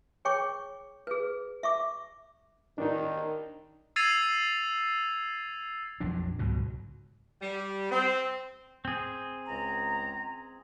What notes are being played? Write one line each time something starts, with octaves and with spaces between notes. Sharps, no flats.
G#4 C#5 G5 C#6 D6
G#4 B4
E5 C#6 D6
D#3 D4 D#4
E6 G#6 A6 C7 D#7 F7
A#1 F2 F#3 D4
C#2 G#2 B2 F#3
G3
C4
C4 G#4
C#2 G#3 A#5